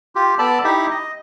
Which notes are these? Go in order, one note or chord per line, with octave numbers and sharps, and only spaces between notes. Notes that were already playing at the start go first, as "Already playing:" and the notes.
F4 G4
B3 A4 D5 A5 B5
D#4 E4 G4 E5
D#5